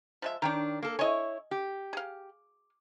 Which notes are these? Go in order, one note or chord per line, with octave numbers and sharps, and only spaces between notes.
F3 G#3 E5
D#3 D4 C#5 G5 A#5
A#3 A4
E4 C#5 D#5 G#5
G4
G#4 F5